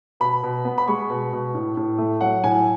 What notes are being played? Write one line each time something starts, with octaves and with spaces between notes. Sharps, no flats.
B2 B5
B2
B3
B5
G#3 C#6
B2
B2
A2
A2
A3
F#3 F#5
A2 G#5